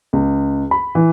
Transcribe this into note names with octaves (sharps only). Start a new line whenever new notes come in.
C#2
B5
E3